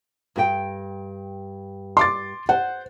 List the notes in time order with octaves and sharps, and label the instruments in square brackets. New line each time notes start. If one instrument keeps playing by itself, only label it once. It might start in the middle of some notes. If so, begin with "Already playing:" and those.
[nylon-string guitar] G2 G4 G5
[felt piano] C6 D6 A6
[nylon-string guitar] C5 [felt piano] F#5